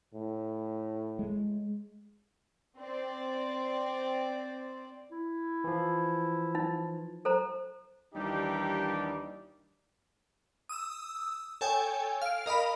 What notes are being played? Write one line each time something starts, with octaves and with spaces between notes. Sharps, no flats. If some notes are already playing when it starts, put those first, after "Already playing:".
A2
G#3
C4 D5
E4
E3 F3
D#4
A4 C5 A#5
D#2 E3 G3 D4 D#4 G4
D#6 E6
A4 C#5 G5 G#5
F5 D7
A#4 D#5 F5 B5